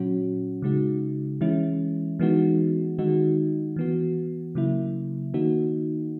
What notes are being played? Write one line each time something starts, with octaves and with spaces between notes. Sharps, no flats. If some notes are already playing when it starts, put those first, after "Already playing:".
Already playing: A#2 F#3 C#4 F#4
C#3 G#3 D#4 F#4
E3 G#3 C#4 E4
E3 G#3 B3 D#4 F#4
D#3 G#3 D#4 F#4
E3 B3 F#4
C#3 F#3 A#3 E4
D#3 A#3 D#4 F#4